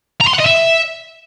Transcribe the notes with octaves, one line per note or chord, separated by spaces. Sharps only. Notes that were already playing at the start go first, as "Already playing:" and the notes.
A#5
C6
F#5
D#5
E5